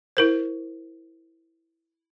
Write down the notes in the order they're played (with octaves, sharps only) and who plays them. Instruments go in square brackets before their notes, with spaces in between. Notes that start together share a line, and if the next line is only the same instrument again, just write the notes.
[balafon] E4 A#4 C5